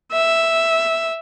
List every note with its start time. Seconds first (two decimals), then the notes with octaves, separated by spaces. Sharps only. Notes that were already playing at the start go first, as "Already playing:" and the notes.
0.12 E5